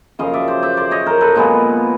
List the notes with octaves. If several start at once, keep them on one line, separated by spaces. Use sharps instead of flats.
F#2 C#3 F3 D#5 F5
D5 E5
C5 D5
D5 E5
C5 D5
C#5 D#5
A#4 C5
A4 B4
A#2 F3 G#3 B3